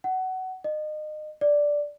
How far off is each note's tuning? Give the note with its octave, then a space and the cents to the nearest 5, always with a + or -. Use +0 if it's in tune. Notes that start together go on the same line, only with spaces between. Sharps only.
F#5 +20
D#5 -30
D5 -5